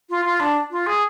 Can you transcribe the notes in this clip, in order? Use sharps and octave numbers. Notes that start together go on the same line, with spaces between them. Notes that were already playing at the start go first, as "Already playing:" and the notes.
F4
F4
D4
F4
G#4